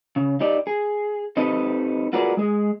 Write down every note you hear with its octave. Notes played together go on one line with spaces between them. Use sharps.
C#3
D#4 G4 D5
G#4
C4 D#4 G4 A4 B4 D#5
F4 F#4 G#4 A#4 B4 D5
G#3 G#4